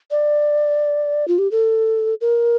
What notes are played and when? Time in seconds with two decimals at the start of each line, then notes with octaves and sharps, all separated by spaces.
0.11 D5
1.28 F4
1.38 G4
1.51 A4
2.21 A#4